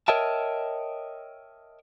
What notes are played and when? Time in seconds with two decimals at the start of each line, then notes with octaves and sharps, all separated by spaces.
0.08 A#4 C#5 D#5 E5 G5 A5